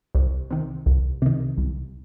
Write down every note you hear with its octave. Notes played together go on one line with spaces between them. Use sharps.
C2
C3 D#3
C2
C3 D#3
C2